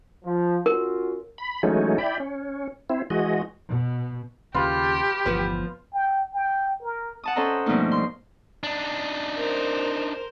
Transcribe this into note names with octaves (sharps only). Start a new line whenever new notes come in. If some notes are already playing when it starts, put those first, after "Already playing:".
F3
C#4 F4 F#4 A#4
B5
E3 F#3 G#3 A3 C#4 D#4
E4 D5 G5 B5
C#4
C4 E4
E3 G#3 F#4 D#5
B2
D#2 C#3 F4 G4 B4
G1 E2 F3 B3
G5
G5
A#4
F#5 A5 D#6
C#4 A4 C5 D#5 A5 A#5
G2 B2 F3 A3 A#3 D#4
C6
D4 D#4
A#4 C5